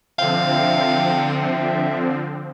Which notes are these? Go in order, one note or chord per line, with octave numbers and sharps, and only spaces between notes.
D3 F3 C4 E5 F5 G5